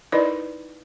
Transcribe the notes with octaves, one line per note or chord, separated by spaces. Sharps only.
D#4 E4 A#4 B4 D5 D#5